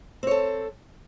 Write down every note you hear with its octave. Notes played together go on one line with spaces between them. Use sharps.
C4 A4 C#5